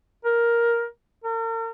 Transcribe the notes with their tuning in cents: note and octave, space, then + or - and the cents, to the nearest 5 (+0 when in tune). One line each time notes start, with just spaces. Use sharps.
A#4 +10
A#4 -45